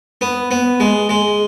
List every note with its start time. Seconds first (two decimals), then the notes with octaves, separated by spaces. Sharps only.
0.21 B3
0.51 B3
0.80 G#3
1.09 G#3